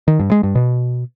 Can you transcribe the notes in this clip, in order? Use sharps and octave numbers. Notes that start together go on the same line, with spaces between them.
D#3
G2
G#3
G2
B2